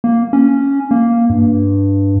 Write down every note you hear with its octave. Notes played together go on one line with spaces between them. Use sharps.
A#3
C#4
A#3
G2